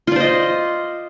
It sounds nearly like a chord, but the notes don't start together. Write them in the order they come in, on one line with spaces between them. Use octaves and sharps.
F4 D5 C5 D#5